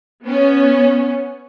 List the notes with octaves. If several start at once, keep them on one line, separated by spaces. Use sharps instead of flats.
B3 C#4